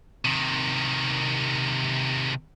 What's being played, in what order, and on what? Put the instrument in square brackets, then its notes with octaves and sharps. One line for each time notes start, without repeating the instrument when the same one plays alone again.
[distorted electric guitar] C3 D#3